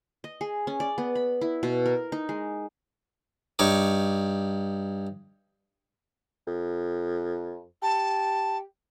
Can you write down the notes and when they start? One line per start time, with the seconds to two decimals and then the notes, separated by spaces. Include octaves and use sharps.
0.24 D#5
0.41 G#4
0.67 C#4
0.80 D5
0.98 B3
1.15 B5
1.41 E4
1.63 B2
1.86 A#4
2.12 D#4
2.29 G#3
3.59 G2 D#4 C#5 D6
6.47 F2
7.83 G4 A5